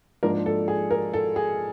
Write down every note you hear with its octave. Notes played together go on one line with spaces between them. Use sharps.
G#2 F3 A#3 D4 A#4
A4
G#4
A#4
A4
G#4